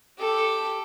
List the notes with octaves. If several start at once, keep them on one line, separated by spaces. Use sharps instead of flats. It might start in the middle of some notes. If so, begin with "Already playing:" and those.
G4 A4